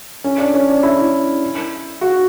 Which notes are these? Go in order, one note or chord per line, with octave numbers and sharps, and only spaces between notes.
C#4
D4
C#4
D4
E4
F#4